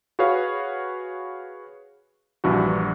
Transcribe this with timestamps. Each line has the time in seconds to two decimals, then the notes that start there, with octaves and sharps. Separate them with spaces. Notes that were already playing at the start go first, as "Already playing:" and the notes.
0.19 F#4 G#4 B4 C#5 F5
2.44 A#1 G2 E3 F#4